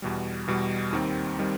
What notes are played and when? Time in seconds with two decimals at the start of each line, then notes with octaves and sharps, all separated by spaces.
0.02 E2 B2 G3
0.47 E2 B2 G3
0.92 D#2 D#3 G3 C4
1.39 D#3 G3 C4